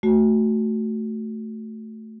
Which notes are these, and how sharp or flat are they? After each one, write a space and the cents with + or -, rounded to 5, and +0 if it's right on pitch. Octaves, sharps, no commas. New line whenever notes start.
A3 +0 F#4 +0